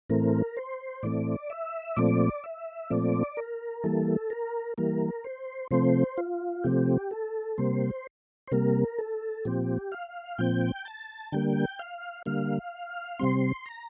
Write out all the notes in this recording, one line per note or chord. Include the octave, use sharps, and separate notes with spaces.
A2 E3 A3 C4 A#4
C5
A2 E3 A3 C4 D5
E5
A#2 F3 A3 C4 D5
E5
A#2 F3 A3 C4 D5
A#4
E3 G3 A#3 A4
A#4
E3 G3 A#3 A#4
C5
C3 F3 A3 C4 C5
F4
C3 F3 A3 C4 G4
A4
C3 G3 A#3 C5
C5
C3 G3 A#3 A#4
A4
A#2 F3 C4 G4
F5
A#2 F3 C4 G5
A5
D3 G3 A#3 G5
F5
D3 G3 A#3 F5
C3 G3 C4 C6
A#5